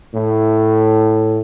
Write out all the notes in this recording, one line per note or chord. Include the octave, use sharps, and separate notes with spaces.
A2